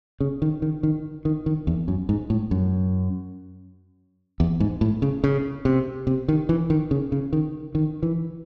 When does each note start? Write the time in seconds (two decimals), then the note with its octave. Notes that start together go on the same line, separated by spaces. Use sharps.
0.20 C#3
0.42 D#3
0.62 D#3
0.83 D#3
1.25 D#3
1.46 D#3
1.67 E2
1.88 F#2
2.09 G#2
2.30 A2
2.51 F#2
4.40 E2
4.60 G#2
4.81 A2
5.02 C#3
5.24 C#3
5.65 C3
6.07 C3
6.28 D#3
6.49 E3
6.70 D#3
6.91 C#3
7.12 C#3
7.33 D#3
7.75 D#3
8.03 E3